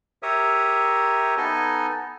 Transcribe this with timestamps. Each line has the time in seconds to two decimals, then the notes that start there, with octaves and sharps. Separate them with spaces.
0.23 G4 A#4 C#5 E5 D#6
1.37 B3 D#4 A4 D#5 G#5